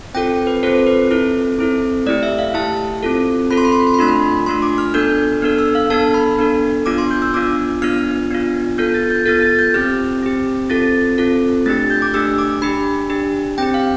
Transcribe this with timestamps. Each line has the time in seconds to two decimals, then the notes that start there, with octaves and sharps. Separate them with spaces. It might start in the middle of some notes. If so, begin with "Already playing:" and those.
0.14 C4 F4 A4 G5
0.47 B4
0.63 C4 F4 A4 C5
0.87 B4
1.10 C4 E4 A4
1.59 C4 E4 A4
2.06 A3 E4 G4 D5
2.23 E5
2.39 F5
2.54 A3 E4 G4 A5
3.03 C4 F4 A4
3.51 C4 F4 A4 B5
3.57 C6
3.65 B5
3.72 C6
3.80 B5
3.87 C6
3.94 B5
3.99 A3 D4 F4 C6
4.08 B5
4.46 A3 D4 F4 C6
4.62 D6
4.78 F6
4.94 B3 D4 A4 G6
5.42 B3 D4 A4 F6
5.58 E6
5.75 F5
5.90 B3 D4 A4 A5
6.14 B5
6.39 B3 D4 A4
6.86 B3 D4 F4 D6
6.98 C6
7.11 G6
7.22 E6
7.34 B3 D4 F4 D6
7.82 B3 D4 F4 F6
8.30 B3 D4 F4
8.78 B3 F4 A4 G6
8.94 A6
9.10 G6
9.26 B3 F4 A4 A6
9.42 A6
9.59 G6
9.74 C4 G4 F6
10.22 C4 G4
10.70 C4 F4 A4 A6
11.18 C4 F4 A4
11.66 A3 D4 G4 A6
11.90 G6
12.02 D6
12.14 A3 D4 G4 E6
12.38 D6
12.62 D4 G4 B5
13.10 D4 G4
13.58 C4 G4 G5
13.74 F5